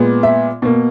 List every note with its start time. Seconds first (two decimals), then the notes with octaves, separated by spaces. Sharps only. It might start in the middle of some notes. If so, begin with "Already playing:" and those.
Already playing: A#2 G#3 B3
0.23 E5
0.62 B2 A#3